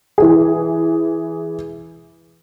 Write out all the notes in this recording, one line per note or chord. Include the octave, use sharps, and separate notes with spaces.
E3 G#4